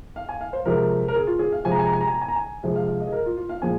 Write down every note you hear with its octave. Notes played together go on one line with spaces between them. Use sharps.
F5
G#5
F5
C5
C3 F3 G#3 A#4
A#4
G#4
F4
G#4
F5
C3 F3 G#3 G#5
A#5
G#5
A#5
G#5
A#5
G#5
A#5
G#5
A#5
G#5
C3 F3 G#3
F5
F5
D#5
G#4
A#4
F4
F4
F5
A#2 F3 G#3 G#5